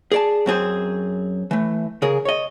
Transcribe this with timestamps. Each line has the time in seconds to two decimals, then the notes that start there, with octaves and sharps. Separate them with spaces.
0.12 G#4 D5 A5
0.46 F#2 C4 G#4 C5
1.51 E3 A3
2.02 C#3 G#4 A#4
2.25 C#5 D#5